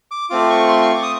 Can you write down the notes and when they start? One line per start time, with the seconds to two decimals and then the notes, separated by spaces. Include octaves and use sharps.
0.11 D6
0.30 A3 C4 F4 D6
0.50 C#6
0.69 C6
0.82 C#6
0.95 D6
1.03 D#6